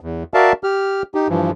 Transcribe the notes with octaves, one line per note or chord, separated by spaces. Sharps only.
E2
F#4 A#4 D5 E5 F5 A5
G4 F6
D#4 G4
G2 E3 F3